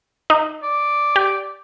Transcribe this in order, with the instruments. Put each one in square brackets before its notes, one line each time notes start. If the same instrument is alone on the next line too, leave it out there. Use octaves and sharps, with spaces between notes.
[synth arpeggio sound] D#4
[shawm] D5
[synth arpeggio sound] G4